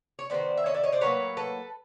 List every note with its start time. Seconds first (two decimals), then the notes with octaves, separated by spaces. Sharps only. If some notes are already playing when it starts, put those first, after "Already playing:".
0.19 C#5
0.30 D#3 G#3 B3 C5 D5
0.57 E5
0.66 C#5 D#5
0.74 D5 E5
0.83 C#5 D#5
0.92 C5 D5
1.01 A2 F#3 A#3 B4 C#5
1.37 A4 B4